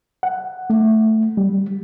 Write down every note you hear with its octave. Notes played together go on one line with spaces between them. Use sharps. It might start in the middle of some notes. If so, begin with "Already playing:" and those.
F#5
A3
G3